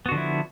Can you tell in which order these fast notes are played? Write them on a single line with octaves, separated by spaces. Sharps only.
B3 F#4 D3 F3 E4